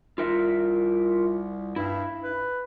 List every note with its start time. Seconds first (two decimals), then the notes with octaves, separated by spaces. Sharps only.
0.18 C2 F4 A#4 E5
1.76 G2 E4
2.23 B4